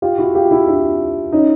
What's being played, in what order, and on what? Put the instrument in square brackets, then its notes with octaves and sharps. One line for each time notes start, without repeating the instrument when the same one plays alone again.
[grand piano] F4 G4
E4 F#4
F4 G4
E4 F#4
D4 E4
C#4 D#4